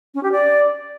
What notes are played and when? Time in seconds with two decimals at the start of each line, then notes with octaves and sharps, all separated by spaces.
0.14 C#4
0.23 G4
0.32 D5